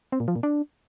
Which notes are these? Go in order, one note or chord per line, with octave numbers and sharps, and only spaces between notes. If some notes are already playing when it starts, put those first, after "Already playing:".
C4
A#2
F3
A#2
D4